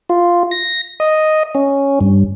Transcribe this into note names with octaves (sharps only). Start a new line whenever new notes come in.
F4
A#6
D#5
C#4
G2